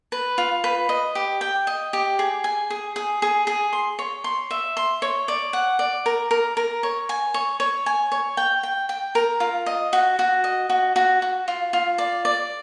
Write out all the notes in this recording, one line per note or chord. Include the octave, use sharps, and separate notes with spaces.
B4
F4
B4
D#5
G4
G5
D#5
G4
G#4
G#5
G#4
G#4
G#4
G#4
C6
C#5
C6
E5
C6
C#5
D5
F#5
D5
A#4
A#4
A#4
C#5
G#5
C#5
C#5
G#5
C#5
G5
G5
G5
A#4
F4
D#5
F#4
F#4
D#5
F#4
F#4
F#4
F4
F4
D5
D5